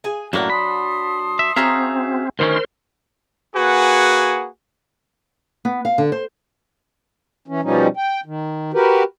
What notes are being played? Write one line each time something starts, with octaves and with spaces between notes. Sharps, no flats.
G#4 G#5
F#2 A2 F#3 A#3 D4 F#5
A5 B5 C6 D#6
E5
C4 C#4 F#4 G#4 E5 F5 A#5
D2 D#3 C#4 A#4 C5 C6
A#3 F#4 G#4 B4 F#5 G#5
B3
F5
D3
C5
E3 C#4
B2 F3 G3 C#4 D#4
G5
D#3
F#4 G4 A#4 B4